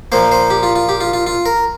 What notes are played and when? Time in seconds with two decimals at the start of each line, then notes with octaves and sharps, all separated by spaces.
0.12 A#2 F3 A#3 C5
0.32 C5
0.50 G4
0.63 F4
0.75 F4
0.89 G4
1.01 F4
1.13 F4
1.27 F4
1.46 A#4